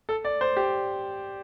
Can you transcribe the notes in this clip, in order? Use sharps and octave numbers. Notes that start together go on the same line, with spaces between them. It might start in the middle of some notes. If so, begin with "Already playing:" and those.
A4
D5
C5
G4